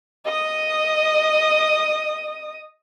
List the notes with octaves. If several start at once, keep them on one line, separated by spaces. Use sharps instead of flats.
D#5 D#6